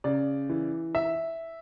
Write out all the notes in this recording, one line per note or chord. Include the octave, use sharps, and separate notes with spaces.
C#3 D5
E3
E5